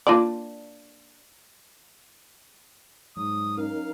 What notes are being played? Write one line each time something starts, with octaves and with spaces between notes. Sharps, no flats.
A#3 D4 F4 D5 D6
G#2 F#3 D#6
C#4 D#4 A#4 F5